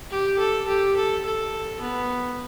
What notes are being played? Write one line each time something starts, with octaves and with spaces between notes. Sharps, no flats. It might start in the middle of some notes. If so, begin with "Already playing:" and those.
G4
A4
G4
A4
A4
B3